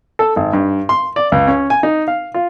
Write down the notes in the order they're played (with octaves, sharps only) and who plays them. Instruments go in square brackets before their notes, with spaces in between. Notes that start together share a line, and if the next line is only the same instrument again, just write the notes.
[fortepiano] A4
G#1
G2
C6
D5
C#2
C#4
G#5
D#4
F5
F4